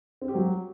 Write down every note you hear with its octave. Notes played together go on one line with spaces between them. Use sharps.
C4
G4
F#3